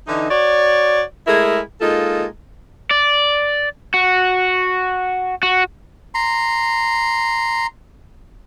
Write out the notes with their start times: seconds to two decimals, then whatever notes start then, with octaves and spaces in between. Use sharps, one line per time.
0.07 D3 E3 D#4
0.30 F#4 C#5 D5
1.27 G#3 A3 E4 G#4 A#4
1.81 G#3 A#3 D#4 F4 A4
2.91 D5
3.94 F#4
5.43 F#4
6.14 A#5 C6